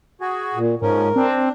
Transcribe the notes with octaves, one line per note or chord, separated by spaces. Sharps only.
F#4 G#4
A#2
G#2 F3 C#4 A#4
C4 D4